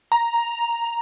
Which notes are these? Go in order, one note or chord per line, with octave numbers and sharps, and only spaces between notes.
A#5